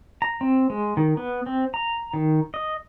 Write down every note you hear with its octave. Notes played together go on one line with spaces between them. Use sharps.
A#5
C4
G#3
D#3
B3
C4
A#5
D#3
D#5